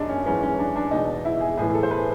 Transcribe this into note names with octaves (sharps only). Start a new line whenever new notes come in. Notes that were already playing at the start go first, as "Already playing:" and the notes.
Already playing: F#2 D#3 D4 D#4
C#4
G#2 E3 C#4
C#4
D4
D4
E2 B2 D#4
E4
G#4
A2 E3 G#4
A4
C5
B4